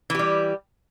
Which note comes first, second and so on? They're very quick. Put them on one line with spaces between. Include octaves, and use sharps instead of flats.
E3 G4 G3